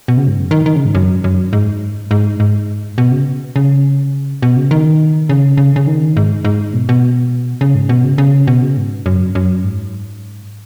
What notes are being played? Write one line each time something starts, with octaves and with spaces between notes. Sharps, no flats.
B2
C#3
G#2
F#2
D#3
D#3
C#3
G#2
F#2
F#2
G#2
G#2
G#2
B2
C#3
C#3
B2
C#3
D#3
C#3
C#3
C#3
D#3
G#2
G#2
B2
B2
C#3
G#2
B2
C#3
C#3
B2
C#3
G#2
F#2
F#2
G#2